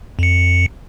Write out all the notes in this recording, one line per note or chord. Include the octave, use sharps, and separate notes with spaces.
F2 C#7